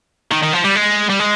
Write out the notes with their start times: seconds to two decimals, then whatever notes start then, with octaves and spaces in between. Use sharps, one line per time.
0.31 D#3
0.43 D#3
0.53 F3
0.64 G3
0.75 G#3
1.10 G3
1.19 G#3